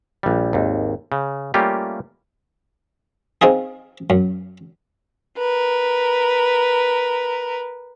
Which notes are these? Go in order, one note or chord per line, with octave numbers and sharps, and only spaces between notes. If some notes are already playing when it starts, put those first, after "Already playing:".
A#1 G3
G#1 D#2
C#3
G3 A3 A#3 C#4 F4 G4
C4 D#4 F4 G#4
F#2
A#4 B4